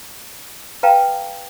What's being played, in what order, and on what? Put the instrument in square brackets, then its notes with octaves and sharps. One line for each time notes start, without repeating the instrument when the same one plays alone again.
[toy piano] B4 F5 G5 A5 A#5